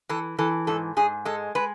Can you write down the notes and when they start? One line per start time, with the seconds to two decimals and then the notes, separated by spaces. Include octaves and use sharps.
0.09 E3 A4
0.39 E3 A4
0.67 G#2 A4
0.97 G#2 G#4
1.25 G#3 A4
1.55 G#3 B4